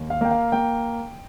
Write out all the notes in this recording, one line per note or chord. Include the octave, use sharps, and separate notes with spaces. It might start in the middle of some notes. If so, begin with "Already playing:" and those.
Already playing: D#2
F5
A#3 G5
F5
A#3 G5